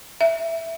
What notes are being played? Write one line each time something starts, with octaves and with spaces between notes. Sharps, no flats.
E5